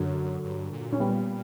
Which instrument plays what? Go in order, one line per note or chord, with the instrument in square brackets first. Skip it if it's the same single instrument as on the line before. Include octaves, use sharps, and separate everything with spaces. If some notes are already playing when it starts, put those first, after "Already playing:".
Already playing: [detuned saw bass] F#2 [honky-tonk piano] D3 F#3
[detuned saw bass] G2
A#2
[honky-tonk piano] C#4
G3 B3